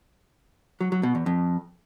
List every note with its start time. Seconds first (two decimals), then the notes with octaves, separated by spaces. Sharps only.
0.81 F#3
0.92 F#3
1.03 B2
1.15 E2
1.26 F2